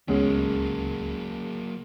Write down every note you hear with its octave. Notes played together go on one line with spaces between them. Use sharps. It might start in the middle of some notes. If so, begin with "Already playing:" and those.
D1 C#2 F#3 G#3 A#3 B3 C#4